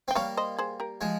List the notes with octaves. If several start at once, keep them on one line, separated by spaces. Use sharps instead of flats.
C4 G5
G3 A#3 C#5 F5
C5 D#5
G#4 C5
G4 A#4
F3 G#3